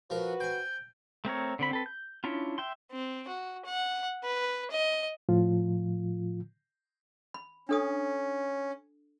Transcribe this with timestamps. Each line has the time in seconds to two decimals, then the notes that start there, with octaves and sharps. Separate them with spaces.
0.10 F3 F#4 A#4 B4
0.40 C5 G5 G#5
1.25 A3 C4 A#4 C#5
1.59 D3 C4 B5
1.71 C4 A4 B4
1.86 G6
2.24 C#4 D4 E4 F4
2.58 E5 G5 C6
2.92 C4
3.28 F#4
3.65 F#5
4.24 B4
4.71 D#5
5.29 A2 F3 F4
7.34 B5
7.69 C#4 D4 A4 D#6